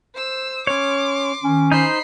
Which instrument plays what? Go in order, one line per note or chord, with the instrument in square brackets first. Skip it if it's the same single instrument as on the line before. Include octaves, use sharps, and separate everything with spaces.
[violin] C5 E6
[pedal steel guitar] C#4 C#5 [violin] C6 D6
[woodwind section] D#3 C#4
[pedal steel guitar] D#4 C5 [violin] B5 C7